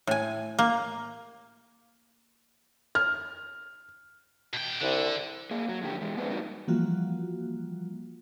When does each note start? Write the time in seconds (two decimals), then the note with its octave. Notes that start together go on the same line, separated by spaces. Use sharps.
0.07 A2 G#5
0.59 A#3
2.95 F6
4.54 B2 G5
4.82 C2 D3
5.51 A#3 G#4
5.68 F#3
5.82 F2 D3 A3 G4
6.01 E3 G#3
6.17 B3 D4 G#4 B4 C5
6.28 G3 G#3 A#3 B3 D#4 F#4
6.68 E3 F3 G3 A#3 F4 F#4